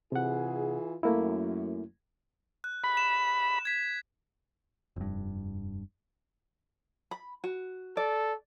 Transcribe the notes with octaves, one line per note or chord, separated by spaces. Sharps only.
C3 E3 F4 G#4 F#5
F#2 A3 A#3 E4
F#6
B5
E7
G#6 B6
F1 G2
B5
F#4
A4 D5